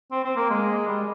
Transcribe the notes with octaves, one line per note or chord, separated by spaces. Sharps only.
C4
C4
A#3
G#3
G3